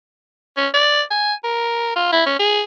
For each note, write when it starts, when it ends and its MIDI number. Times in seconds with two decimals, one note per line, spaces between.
0.57 0.68 61
0.74 1.02 74
1.11 1.34 80
1.44 1.96 70
1.96 2.12 65
2.12 2.21 64
2.26 2.36 61
2.39 2.63 68